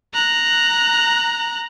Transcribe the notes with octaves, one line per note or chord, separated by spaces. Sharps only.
A#5 F#6